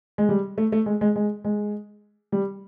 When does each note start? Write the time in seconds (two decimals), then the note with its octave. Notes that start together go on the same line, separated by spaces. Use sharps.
0.18 G#3
0.29 G3
0.58 A3
0.72 A3
0.86 G#3
1.01 G#3
1.16 G#3
1.45 G#3
2.32 G3